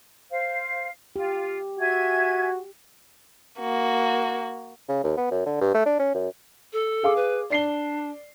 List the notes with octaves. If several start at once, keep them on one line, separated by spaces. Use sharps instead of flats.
C5 F5
F4 G4
F#4 E5 G#5 G#6
A#3 F#4
C#3
D#2
B3
F#2
D3
G2
A3
D4
C#4
F#2
A4
G#4 F5 D6
B4
D4 D5 C7 G7